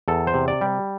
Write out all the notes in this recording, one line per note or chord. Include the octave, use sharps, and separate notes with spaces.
E2 A4
C5
C3
D5
G3